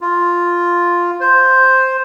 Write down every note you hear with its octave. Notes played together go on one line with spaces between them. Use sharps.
F4
C5